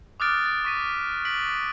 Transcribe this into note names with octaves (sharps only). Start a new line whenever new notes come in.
D6 D#6 F6 F#6 A6 D7
A6 D7
C#6 B6 D#7
B6 D7 F#7